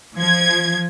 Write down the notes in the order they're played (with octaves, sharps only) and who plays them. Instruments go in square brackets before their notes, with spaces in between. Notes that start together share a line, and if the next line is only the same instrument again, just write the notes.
[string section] F3 G#6